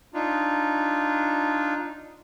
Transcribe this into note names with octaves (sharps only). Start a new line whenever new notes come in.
D4 D#4 F4